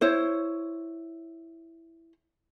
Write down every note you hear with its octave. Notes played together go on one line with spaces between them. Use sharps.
E4 C5 C#5